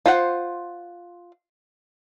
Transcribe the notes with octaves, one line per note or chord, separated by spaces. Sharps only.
F4 C5 F#5